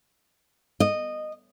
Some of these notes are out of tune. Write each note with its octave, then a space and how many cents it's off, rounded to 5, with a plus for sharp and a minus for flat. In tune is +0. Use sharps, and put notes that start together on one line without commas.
D#5 -15